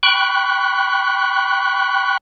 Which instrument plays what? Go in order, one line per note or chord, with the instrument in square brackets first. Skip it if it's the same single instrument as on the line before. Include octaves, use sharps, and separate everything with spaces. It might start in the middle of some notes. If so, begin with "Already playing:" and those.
[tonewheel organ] G5 B5 C#6 F#6